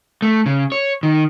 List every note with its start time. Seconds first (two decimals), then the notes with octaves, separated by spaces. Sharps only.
0.22 A3
0.46 C#3
0.72 C#5
1.03 D#3